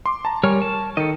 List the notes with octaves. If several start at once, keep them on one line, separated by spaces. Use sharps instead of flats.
C6 D6
A5 A#5
G3 A#4 C#5 G#5 C#6 F6
A5
D#3 A4 D#5